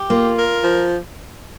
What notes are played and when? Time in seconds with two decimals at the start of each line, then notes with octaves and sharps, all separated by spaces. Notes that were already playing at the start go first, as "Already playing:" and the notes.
Already playing: G4
0.10 A#3 F4
0.37 A#4
0.62 F3